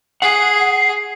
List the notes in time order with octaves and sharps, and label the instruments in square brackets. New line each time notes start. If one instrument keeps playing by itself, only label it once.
[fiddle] G#4 [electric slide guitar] F#5 [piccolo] C7